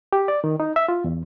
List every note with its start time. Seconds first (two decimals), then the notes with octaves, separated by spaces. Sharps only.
0.13 G4
0.28 D5
0.44 D#3
0.60 D#4
0.76 E5
0.88 F4
1.04 E2